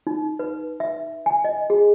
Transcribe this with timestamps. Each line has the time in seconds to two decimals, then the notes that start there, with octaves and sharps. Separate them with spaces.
0.07 D#4
0.39 B4
0.80 E5
1.26 G#5
1.45 D#5
1.70 G#4